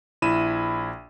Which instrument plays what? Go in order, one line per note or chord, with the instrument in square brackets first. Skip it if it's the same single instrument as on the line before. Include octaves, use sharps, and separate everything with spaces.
[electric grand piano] A#1 E4 B5 D#7 E7